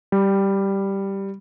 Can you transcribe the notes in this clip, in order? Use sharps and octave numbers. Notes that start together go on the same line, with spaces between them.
G3